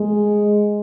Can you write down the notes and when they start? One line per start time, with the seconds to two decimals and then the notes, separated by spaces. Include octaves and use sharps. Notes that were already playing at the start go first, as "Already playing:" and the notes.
Already playing: G#3